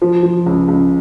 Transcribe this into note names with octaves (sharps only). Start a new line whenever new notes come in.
F3
F3
C#2
C#2